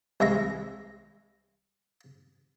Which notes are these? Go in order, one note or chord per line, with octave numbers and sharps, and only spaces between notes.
C2 G#3 E5 A#5